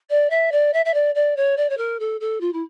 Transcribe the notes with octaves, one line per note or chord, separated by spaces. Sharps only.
D5
E5
D5
E5
E5
D5
D5
C#5
D5
C#5
A#4
A4
A4
F4
E4